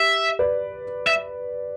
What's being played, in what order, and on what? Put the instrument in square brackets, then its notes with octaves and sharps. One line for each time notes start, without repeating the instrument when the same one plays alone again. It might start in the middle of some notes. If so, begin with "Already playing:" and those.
Already playing: [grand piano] G4 [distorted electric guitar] E5
[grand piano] B4 D5
[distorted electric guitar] E5